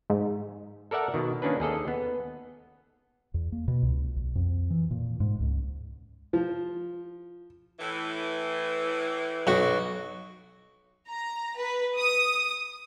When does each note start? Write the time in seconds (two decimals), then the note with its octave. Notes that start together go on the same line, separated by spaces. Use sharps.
0.10 G#2
0.91 A4 A#4 D5 E5 F#5 A5
1.14 B2 D#3
1.42 D#3 A#3 C#4 D4 B4
1.60 D#2 G#4 A4 D#5
1.88 B3
3.34 E2
3.52 A#3
3.68 B2
3.83 C#2
4.16 B1
4.35 F2
4.70 E3
4.91 A#2
5.20 G#2
5.40 C#2
6.33 F3
7.80 A2 E3
9.47 B1 F#4
11.09 A#5
11.60 B4
11.98 D#6